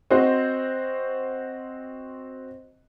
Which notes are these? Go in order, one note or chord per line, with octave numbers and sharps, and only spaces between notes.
C4 F#4 C5 D#5